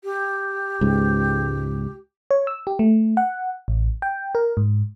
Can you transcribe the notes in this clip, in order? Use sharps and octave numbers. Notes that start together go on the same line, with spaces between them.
G4
C#2 G#2
C#5
E6
G4
A3
F#5
A1
G5
A#4
G#2